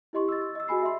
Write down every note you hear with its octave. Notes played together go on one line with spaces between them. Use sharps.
E4 G4 D#5 C6 C#6
E6 A6
A6
D#5 E6
F#4 G#4 G#5 B5 C7
E5 C6